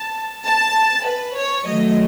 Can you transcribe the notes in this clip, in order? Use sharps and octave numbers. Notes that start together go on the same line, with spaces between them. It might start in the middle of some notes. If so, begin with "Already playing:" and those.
Already playing: A5
A5
B4
C#5
D#3 F#3 A3 D#5